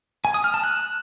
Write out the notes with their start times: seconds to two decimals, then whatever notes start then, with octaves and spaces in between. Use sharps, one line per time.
0.25 G#5
0.34 D#6
0.44 F6
0.54 A5
0.64 F#6